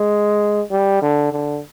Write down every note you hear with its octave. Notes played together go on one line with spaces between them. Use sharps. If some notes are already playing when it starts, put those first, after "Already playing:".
Already playing: G#3
G3
D3
D3